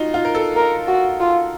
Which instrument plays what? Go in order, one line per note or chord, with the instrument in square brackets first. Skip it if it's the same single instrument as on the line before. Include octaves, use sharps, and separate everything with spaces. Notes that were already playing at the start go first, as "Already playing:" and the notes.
Already playing: [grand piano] D#4 F4 F#4
F4
A#4
A4
[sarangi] A#4
F#4
F4